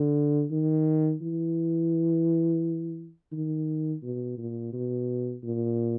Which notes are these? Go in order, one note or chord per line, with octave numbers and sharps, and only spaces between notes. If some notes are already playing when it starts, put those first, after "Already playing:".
Already playing: D3
D#3
E3
D#3
B2
A#2
B2
A#2